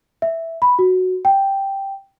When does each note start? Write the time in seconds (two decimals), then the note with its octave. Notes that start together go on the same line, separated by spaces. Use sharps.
0.22 E5
0.62 B5
0.79 F#4
1.25 G5